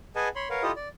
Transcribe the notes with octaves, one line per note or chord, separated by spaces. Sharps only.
G#4 B4 D#5 F#5 G#5 A5
C#5 B5 C6
A#4 B4 C#5 F5 F#5
E4 F4 G4 A4 D#5 D#6
D5